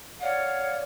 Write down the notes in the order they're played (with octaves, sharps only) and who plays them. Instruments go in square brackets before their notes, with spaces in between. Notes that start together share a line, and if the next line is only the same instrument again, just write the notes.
[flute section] C#5 D5 [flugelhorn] F5 [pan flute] F#5